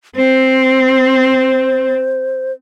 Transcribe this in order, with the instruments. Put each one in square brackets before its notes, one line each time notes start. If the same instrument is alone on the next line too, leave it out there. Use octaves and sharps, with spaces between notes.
[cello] C4 [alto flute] C5